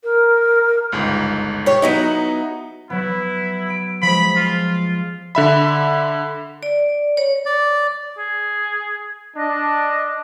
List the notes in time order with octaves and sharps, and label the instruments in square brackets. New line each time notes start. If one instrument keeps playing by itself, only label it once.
[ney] A#4
[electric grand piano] G1 C#2 G#2
[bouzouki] G4 C#5
[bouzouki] F#3 B3 E4 [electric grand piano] D#4 D#5
[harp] F#3 B3 [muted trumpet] E4
[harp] E6 B6 D7
[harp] F3 G#3 [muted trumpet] B5
[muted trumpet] F4
[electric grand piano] D3 E5 B5
[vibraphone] D5
C#5
[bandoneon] D5
[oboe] G#4
[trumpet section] D4 [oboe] D#5